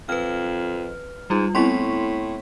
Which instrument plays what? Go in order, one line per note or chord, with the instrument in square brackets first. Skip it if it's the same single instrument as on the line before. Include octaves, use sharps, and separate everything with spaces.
[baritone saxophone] F2 [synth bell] B4 F6
[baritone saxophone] G#2 [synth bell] G3 F4
[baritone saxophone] A2 [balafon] B3 C4 E4 [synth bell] C6 C#6 B6